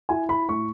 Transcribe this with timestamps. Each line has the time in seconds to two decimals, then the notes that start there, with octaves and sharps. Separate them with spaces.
0.09 E4 G#5
0.29 B5
0.49 A2 C#6